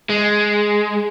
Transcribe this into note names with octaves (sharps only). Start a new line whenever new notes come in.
G#3